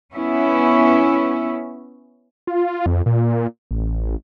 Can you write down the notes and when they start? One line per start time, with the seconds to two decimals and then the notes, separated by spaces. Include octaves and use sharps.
0.14 B3 C#4 E4
2.47 F4
2.86 F2
3.06 A#2
3.71 A1